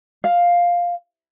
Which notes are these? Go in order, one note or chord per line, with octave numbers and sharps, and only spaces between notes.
F5